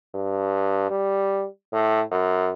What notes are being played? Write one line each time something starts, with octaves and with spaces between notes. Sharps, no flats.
G2
G3
A2
F#2